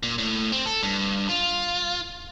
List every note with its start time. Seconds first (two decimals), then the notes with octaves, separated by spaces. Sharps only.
0.03 A#2
0.18 A2
0.52 C4
0.66 A4
0.83 G2
1.29 F4